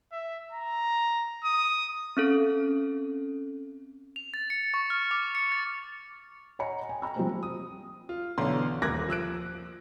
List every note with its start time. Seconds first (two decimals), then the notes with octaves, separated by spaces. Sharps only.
0.12 E5
0.52 A#5
1.44 D#6
2.17 C4 C#4 A4
4.16 F7
4.34 A6
4.50 C#7
4.74 C#6
4.90 F6
5.11 D6
5.35 C#7
5.52 A6
6.59 C#5 D#5 F#5 G#5 A#5 C#7
6.89 D#5 G5 G#5
7.02 G5 A#5 E6
7.16 F3 G3 G#3 A#3 C4
7.43 D#6
8.09 F4
8.38 B1 D3 E3 A#5 C6
8.82 D#1 A#4 D6 F#6 G#6 A#6
9.08 F3 E6 F#6 D7